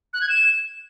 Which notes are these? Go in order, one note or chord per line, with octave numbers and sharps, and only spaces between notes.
F#6
G#6
E7